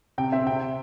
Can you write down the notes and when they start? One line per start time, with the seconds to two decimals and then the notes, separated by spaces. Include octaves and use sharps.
0.18 C3 G5
0.32 C4 E5
0.47 C3 G5